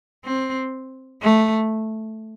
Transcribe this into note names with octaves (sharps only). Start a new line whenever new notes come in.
C4
A3